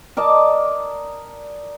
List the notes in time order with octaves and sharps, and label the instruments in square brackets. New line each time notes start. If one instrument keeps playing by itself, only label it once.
[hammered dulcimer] A#4 D5 D#5 A5